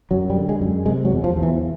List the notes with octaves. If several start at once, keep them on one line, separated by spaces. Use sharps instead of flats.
F#2 F#3
G3
D3
G#3
F#2
C3 G#3
F#3
E2
F3
E2
E3